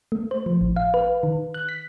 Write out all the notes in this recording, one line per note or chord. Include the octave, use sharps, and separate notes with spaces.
A3
C5
F3
A1
F5
B4
D#3
F#6
B6